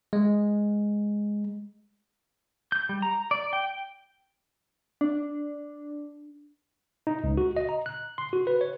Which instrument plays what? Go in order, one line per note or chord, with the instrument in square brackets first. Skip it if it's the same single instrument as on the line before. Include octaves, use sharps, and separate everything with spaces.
[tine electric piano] G#3
[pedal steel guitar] G6
G3
A#5
D5
G5
[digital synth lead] D4
[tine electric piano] D#4
C#2
F#4
D#5
A#5
F#6
C6
F#4
B4
C#5